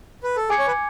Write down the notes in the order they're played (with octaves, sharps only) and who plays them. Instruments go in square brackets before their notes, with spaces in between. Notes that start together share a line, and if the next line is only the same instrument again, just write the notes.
[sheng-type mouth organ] B4
A4
[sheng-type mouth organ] G#4 [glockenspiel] G#5 D6 G#6 C#7
[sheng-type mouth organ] C#5
B4